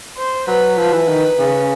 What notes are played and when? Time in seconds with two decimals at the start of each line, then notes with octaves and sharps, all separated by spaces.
0.17 C5
0.47 F#3 B4
0.78 F3 B4
0.93 E3
1.08 D#3
1.39 C#3